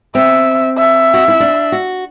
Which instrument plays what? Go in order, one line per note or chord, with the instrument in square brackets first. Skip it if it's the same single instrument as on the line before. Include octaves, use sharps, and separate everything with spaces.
[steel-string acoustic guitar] C4 [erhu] E5
[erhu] E5
[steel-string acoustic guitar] F#4
E4
D4
F#4